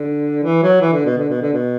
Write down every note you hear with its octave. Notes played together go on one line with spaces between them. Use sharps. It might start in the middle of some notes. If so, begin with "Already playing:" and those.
Already playing: D3
E3
F#3
E3
D3
B2
D3
B2
D3
B2